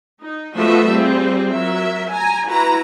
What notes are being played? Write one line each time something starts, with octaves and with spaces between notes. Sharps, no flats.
D#4
F3 A3 B3 F#4 D#5 E5
G3 C4 F4 G#4
F#3 A#4 E5
G#5 A#5
E4 F#4 B4 A#5